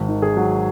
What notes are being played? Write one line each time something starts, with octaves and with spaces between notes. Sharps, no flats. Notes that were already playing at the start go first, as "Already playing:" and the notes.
Already playing: G#1
D#3
G#4
F#3